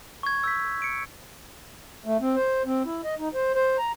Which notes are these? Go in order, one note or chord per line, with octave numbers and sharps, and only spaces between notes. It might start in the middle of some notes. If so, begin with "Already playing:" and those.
C#6 G#6
E6 G6 B6
C#7 D7
A3
C4
C5
C4
E4
D#5
D#4
C5
C5
A#5